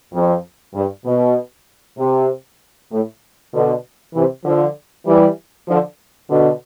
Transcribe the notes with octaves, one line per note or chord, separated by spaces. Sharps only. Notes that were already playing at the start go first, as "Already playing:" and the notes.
F2
G2
B2
C3
A2
B2 D3
C3 E3
D3 F3
E3 G3
D3 F3
B2 D3